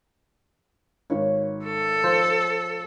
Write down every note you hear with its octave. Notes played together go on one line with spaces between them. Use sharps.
G#1 D#3 C#5
A4
F3 C5